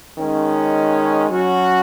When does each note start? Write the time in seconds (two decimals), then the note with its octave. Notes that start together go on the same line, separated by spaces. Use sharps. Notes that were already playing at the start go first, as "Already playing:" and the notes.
0.17 D#3 G#3 C#4
1.29 F#3 C#4 F#4